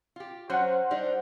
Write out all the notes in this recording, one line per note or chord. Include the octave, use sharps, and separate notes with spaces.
F4 G4
F#3 C#4 F#4 C5 F#5
G3 D4 D#4